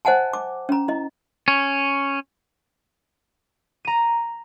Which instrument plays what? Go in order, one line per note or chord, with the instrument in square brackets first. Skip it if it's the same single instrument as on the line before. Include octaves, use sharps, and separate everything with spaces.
[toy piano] C5 D#5 F#5 G#5 A5
D6
C#4 A#5
E4 D#5
[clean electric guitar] C#4
[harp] A#5 D#7